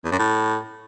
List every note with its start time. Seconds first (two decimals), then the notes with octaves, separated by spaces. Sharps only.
0.05 E2
0.12 F#2
0.19 A2